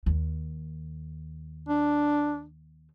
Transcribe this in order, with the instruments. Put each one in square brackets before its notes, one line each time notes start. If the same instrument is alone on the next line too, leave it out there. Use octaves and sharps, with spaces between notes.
[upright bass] D#2
[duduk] D4